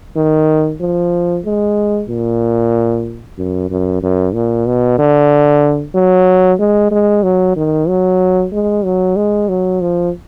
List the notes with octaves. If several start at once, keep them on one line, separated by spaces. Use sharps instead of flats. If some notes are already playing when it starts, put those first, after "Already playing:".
D#3
F3
G#3
A#2
F#2
F#2
F#2
A#2
B2
D3
F#3
G#3
G#3
F#3
D#3
F#3
G#3
F#3
G#3
F#3
F3